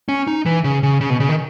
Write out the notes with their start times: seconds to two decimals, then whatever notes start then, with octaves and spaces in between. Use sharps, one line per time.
0.09 C#4
0.27 D#4
0.46 E3
0.64 C#3
0.83 C#3
1.01 C#3
1.10 B2
1.20 C#3
1.29 D#3